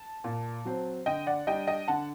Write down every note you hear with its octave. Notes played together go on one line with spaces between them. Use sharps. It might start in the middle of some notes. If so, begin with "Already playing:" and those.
Already playing: A5
A#2
F#3 C4
D3 D#5 G5
D5 F#5
G3 D4 D#5 G5
D#5 G5
D3 F#5 A5